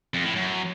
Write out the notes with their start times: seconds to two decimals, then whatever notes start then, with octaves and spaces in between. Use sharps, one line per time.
0.14 F2
0.25 A2
0.36 F#2